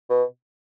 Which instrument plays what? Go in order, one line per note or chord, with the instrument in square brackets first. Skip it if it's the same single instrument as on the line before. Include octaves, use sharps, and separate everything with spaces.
[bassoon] B2